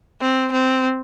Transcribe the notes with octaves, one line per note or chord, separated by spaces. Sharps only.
C4
C4